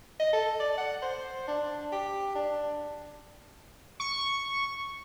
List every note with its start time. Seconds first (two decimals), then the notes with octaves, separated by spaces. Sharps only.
0.19 D#5
0.33 A4
0.59 D5
0.78 F#5
1.02 C5
1.48 D4
1.92 G4
2.35 D4
4.00 C#6